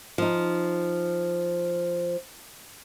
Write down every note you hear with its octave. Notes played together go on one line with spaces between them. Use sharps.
F3 D#4